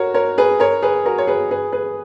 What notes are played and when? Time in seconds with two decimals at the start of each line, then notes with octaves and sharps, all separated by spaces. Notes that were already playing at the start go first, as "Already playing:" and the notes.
Already playing: F#4 A#4 C#5
0.14 A#4 C#5
0.38 G#4 B4
0.60 A#4 C#5
0.82 G#4 B4
1.05 F#4 A#4
1.18 C#5
1.27 G#4 B4
1.51 G#4 B4
1.73 G#4 B4